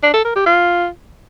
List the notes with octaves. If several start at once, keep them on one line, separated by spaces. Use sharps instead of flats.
D4
A4
A#4
G4
F4